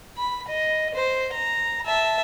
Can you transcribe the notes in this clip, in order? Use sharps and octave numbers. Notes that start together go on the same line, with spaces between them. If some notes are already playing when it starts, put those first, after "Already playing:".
B5
D#5
C5
A#5
E5 A5